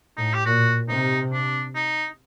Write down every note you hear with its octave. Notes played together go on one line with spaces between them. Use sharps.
A2 D#4
G4
A#2 F#4
C3 D#4
D4
D#4